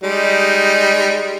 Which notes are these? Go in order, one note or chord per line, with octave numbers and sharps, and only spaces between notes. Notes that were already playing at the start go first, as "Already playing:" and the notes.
G3 G#3 D#4